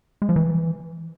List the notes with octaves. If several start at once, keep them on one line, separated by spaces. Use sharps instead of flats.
G#3
F3
E3